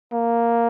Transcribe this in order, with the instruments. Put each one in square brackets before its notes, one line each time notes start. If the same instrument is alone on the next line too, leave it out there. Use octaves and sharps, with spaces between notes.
[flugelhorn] A#3